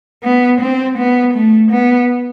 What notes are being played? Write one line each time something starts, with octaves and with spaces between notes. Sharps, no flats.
B3
C4
B3
A3
B3